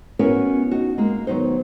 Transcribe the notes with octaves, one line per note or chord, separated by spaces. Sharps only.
B3 C#4 E4 F#4 A#4 B4
D#4 F#4
G#3 A#3
D#3 F#3 B3 D#4 C5